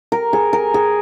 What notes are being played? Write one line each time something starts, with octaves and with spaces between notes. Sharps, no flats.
A#4
G#4
A#4
G#4